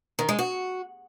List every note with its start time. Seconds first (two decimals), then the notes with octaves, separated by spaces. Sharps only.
0.19 D#3
0.29 G#3
0.39 F#4